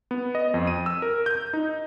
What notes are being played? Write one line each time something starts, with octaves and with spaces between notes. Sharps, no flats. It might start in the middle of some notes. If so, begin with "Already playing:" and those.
B3
D#5
F2
D#7
E6
A#4
G6
D#4